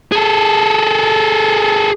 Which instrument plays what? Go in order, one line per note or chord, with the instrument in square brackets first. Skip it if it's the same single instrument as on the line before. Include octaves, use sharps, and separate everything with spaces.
[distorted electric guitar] G#4 A4